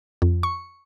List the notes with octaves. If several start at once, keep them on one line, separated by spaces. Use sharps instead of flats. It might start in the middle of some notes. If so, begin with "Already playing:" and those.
F2
C#6